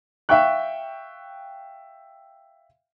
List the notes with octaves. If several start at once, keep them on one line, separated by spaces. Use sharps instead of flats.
E5 F5 G5 C#6 F#6